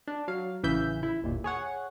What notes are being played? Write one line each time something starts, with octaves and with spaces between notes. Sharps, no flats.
D4
F#3 F5
A1 C#3 E3 E5 G6
E4
G1 D#2 A#2
G#4 C#5 F#5